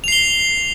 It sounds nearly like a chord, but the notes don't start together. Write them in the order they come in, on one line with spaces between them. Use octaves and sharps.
F7 C7 G7